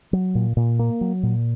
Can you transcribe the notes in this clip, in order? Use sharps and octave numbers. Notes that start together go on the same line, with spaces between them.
F#3
A#2
A#2
A#3
F#3
A#2